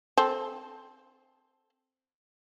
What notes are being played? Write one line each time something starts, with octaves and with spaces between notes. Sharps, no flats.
C4 A4